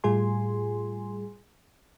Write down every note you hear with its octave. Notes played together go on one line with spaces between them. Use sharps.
A2 G3 F4 G#4 G#5 C6